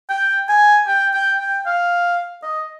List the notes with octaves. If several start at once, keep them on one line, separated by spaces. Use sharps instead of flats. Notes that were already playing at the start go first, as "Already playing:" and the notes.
G5
G#5
G5
G5
G5
F5
D#5